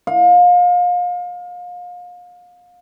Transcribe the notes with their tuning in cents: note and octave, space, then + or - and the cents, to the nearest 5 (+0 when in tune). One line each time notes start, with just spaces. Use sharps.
F5 +30